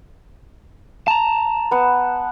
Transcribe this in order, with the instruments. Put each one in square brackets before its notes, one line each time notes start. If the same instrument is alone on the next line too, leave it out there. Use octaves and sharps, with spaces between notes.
[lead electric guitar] A5 A#5
[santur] B3 F#5